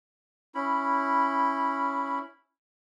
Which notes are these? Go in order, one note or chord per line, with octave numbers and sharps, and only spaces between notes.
C#4 E4 B5